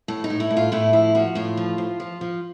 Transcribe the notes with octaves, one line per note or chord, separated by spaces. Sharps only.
A2 A4
D#4
A2
E4
A2
F4
A2 E4
F3 E4
F3 F#4
A2 F4
F3
F3
F3
F3